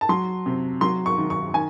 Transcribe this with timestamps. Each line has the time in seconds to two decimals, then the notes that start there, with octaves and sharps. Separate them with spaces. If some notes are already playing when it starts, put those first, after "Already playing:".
0.01 A5
0.09 F#3 C6
0.46 C3
0.81 F#3 C6
1.06 C#6
1.18 D#3
1.30 C#6
1.54 D#3 G#5